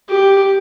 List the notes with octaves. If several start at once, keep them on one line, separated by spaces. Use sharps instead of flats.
G4